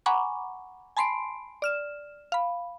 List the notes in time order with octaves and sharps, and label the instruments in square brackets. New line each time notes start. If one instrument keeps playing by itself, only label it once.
[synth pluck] F#5 G#5 A#5 B5 C#6 D6
G#5 A5 B5 C6 C7 D7
D5 F6 E7
F5 B5